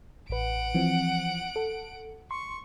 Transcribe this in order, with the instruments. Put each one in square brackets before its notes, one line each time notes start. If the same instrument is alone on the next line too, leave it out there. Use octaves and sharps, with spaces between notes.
[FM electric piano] A1 B4 [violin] F#5 D7
[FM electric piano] E3 F3 C4
A4
[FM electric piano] C6 [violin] C#6